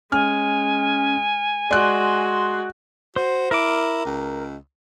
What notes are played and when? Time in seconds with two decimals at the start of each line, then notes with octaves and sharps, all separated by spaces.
0.12 G#3 C#4 G#5 F6
1.71 G#3 F#4 D5 C6 F#6
3.16 F#4 C5
3.51 E4 A#4 D6
4.05 C#2